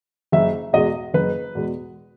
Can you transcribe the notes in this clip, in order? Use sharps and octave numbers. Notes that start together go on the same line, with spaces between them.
F#1 E5
E2 B2 G#3 D#5
F#1 B4
E2 B2 G#3